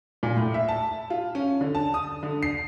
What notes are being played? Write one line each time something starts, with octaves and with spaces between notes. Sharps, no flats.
A#2
A2
E5
A5
F4
C#4
D3
A5
D#6
D3
C7